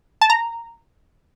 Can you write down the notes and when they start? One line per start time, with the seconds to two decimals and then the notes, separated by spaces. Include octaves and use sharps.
0.21 A5
0.30 A#5